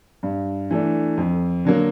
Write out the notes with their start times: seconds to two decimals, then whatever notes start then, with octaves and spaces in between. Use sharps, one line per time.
0.23 G2
0.71 E3 A3 D4
1.17 F2
1.65 D3 F#3 A#3